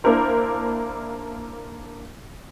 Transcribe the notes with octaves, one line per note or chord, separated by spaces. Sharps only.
A#3 D4 E4 A#4 C5